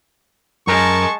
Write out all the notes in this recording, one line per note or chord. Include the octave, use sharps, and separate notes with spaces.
F#2 G#3 A#4 A5 C#6